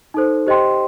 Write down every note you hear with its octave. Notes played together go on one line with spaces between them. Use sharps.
D#4 A4 C5
G4 C5 D#5 G5 C6